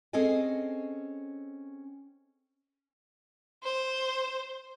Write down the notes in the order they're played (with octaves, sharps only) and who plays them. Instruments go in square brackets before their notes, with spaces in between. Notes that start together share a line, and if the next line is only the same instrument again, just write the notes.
[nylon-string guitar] C4 C#4 G#4 A4 D#5 G#5
[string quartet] C5